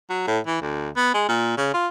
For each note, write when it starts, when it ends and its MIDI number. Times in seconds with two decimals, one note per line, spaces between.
0.10 0.23 54
0.27 0.39 45
0.47 0.60 52
0.61 0.90 38
0.97 1.12 59
1.14 1.23 56
1.29 1.55 46
1.58 1.70 49
1.74 1.88 65